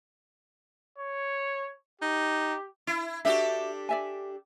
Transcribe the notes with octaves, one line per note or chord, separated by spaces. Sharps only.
C#5
D#4 G4
E4
D4 F#4 G4 A4 E5
D5 E5 G#5